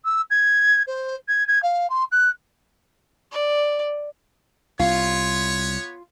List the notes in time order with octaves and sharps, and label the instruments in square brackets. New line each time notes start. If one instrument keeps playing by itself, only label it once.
[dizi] E6
G#6
C5
G#6
G#6
F5
C6
F#6
[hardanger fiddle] D5
[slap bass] C2 [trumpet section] B3 C#5 [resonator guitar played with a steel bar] F4